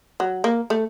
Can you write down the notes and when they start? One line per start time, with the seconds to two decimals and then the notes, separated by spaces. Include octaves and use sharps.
0.20 F#3
0.44 A#3
0.70 A3